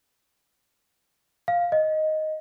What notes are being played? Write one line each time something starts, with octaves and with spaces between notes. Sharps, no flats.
F5
D#5